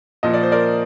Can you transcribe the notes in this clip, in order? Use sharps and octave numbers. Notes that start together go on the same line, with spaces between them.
A#2 F3 D#5
D5
C5
A#4 D5